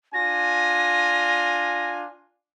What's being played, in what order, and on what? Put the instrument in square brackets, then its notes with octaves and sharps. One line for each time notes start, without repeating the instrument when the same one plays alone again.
[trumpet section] D4 F4 G#5 [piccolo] A#6